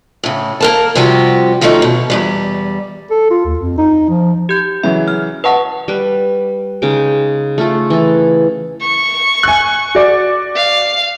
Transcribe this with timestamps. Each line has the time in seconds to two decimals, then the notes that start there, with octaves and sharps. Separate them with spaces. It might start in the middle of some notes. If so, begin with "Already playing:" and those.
0.24 A2 C#3
0.60 A#3 A#4 A5
0.95 C3 F3 G3 F#4 G4
1.61 D#3 F3 A3 C#4 D#4
1.82 B2
2.10 E2 G#2 G3
3.10 A4
3.31 F4
3.45 D#2
3.59 F2
3.78 D#4
4.09 F3
4.49 G4 G6
4.83 C#3 E3 F#3 E5
5.08 F6
5.44 B4 D#5 F#5 A5 C#6
5.88 G3 B4
6.82 C#3 G#3 D#4 G5
7.58 A3 F4 A4
7.90 E3 A4
8.82 C#6
9.43 G#5 F#6
9.95 F#4 D5
10.56 F5